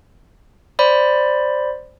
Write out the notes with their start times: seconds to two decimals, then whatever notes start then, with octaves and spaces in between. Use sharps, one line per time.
0.79 C5 D5 B5